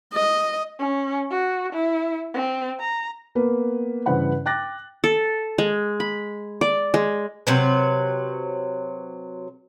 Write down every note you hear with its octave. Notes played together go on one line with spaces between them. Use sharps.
D#5
C#4
F#4
E4
C4
A#5
A#3 B3 B4
G2 C#3 E3 C5 F#5 B5
G5 D6 F#6 A6 A#6
A4
G#3
B5
D5
G#3
C3 F#3 B4